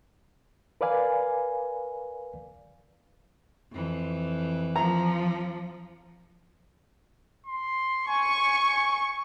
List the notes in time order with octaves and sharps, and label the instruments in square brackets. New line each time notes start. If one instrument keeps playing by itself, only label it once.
[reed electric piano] A#4 B4 D5 F5 G#5
[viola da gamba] F2 E3
[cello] F3 [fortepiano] A#5
[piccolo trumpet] C6
[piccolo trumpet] G#5 [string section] C#6